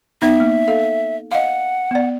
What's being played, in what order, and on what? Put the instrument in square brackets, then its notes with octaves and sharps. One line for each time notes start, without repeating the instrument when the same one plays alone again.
[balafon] B3 D#4 [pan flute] E5
[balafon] A#3
A4 F5
[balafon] D#5 F5 [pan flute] F#5
[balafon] B3 D5